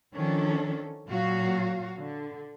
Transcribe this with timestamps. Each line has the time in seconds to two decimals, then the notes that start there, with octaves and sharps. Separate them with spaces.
0.14 D#3 F3 C#4 D4 A4
1.08 A#2 F#3 F#4 F5
1.99 D3